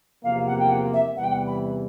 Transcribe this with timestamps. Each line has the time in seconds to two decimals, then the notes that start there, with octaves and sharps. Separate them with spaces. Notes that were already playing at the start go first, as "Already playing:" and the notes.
0.23 E2 C3 F3 A#3 F5
0.46 F#5
0.59 G5
0.69 F#5
0.93 E5
1.16 E2 C3 E3 G3 F#5
1.23 G5
1.31 F#5
1.47 B5